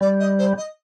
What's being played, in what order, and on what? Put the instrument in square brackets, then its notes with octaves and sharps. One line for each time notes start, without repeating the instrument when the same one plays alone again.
[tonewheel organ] G3 [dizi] D5
[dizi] D#5
C5
D#5